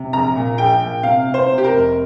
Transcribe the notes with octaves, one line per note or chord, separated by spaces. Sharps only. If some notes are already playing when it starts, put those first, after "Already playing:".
Already playing: C3
A#1 A#5
A#2
A#1 G5
A#2
C3 F5
C3
C5
C3
G4
A#4
F1